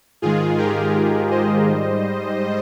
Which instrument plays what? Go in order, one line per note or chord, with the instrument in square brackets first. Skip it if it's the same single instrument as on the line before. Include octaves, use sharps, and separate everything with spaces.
[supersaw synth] G#2 D#3 G#3 F4 G#4
G4 A#4
C5 D#5
G#2 G3